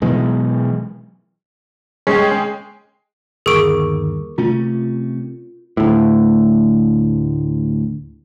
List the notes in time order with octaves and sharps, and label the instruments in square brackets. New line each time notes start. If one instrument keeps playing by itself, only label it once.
[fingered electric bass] B2 E3 F#3 G#3
[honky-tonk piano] G#3 G#4 G5 [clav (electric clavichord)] C#4
[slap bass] G1 D#2 [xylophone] G#4 D7 [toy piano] A#4 C#6 D6
[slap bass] C3 A3 C#4 [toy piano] F4
[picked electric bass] D2 A2